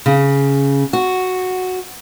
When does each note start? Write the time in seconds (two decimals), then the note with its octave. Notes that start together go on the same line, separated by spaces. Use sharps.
0.06 C#3
0.93 F#4